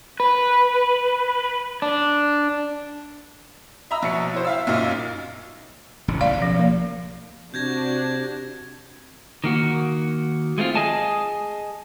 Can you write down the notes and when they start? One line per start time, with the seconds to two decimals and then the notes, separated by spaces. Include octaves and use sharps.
0.20 B4
1.82 D4
3.91 D#5 E5 A#5 B5 E6
4.03 A#1 B2 C#5 C#7
4.33 E4 C5
4.45 E5 F5 E6
4.67 B1 F#2 A#2 D#4 F5 F6
6.08 E1 A1 C#3
6.21 B1 C#3 D5 F5
6.42 F3
6.59 A#3
7.54 C3 D4 F#4 G6 G#6 A#6
9.44 D#3 A#3 F#4
10.58 G#3 A3 C4 F4
10.75 G#4 D#5 G#5 A5